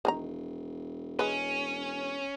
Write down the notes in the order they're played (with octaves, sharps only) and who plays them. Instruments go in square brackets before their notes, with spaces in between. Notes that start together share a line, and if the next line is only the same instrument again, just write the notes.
[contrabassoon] E1 [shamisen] D#3 G#4 A#5
[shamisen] G#3 B4 [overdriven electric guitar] C#4